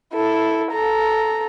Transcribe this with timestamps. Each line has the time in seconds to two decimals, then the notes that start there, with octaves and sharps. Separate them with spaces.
0.14 E4 A4
0.72 A4 A#5